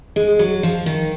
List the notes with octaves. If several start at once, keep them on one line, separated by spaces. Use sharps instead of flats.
G#3
F#3
F3
D#3